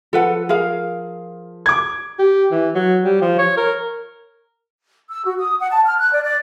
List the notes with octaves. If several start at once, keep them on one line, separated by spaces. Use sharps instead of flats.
F3 A4 B4 F#5
G#4 A#4 F5
D6 G#6
G4
E3
F#3
G3
F3
C#5
A#4
E6
F#4
D#6
F#5
A5
F6
F#6
D5
D5